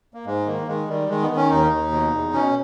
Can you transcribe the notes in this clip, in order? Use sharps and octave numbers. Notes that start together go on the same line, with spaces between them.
A#3
G#2 G#3
D#3 A#3
D#3 G#3
D#3 G3
D#3 G#3
B3
D#3
C#4
D#2 D#4
D#2
B2
E2
B2 C#4